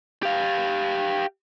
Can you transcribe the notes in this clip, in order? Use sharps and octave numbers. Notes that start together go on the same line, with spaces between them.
G4 F5